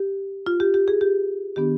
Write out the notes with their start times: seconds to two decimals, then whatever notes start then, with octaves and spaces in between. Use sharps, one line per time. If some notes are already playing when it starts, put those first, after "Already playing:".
Already playing: G4
0.46 F4
0.60 G4
0.74 G4
0.88 G#4
1.01 G4
1.56 D#3 B3 D4 G4